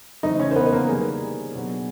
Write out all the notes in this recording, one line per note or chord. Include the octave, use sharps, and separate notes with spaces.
C#3 E3 A3 C4 D#4 D#5
C#4 C#5
C5
B3 B4
B4
A#3 A#4
D#3 G3 C4 G#4
B2 F#3 B3 D4